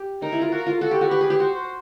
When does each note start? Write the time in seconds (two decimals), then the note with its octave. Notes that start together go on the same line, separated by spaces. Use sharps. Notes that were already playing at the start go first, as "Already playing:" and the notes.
Already playing: G4
0.22 D#4 A#4
0.32 E4
0.42 F4
0.52 F#4 A#4
0.66 F4
0.81 F#4 A4
0.91 G4
1.01 F#4
1.10 G4 B4
1.21 G#4
1.30 G4
1.40 F#4 C5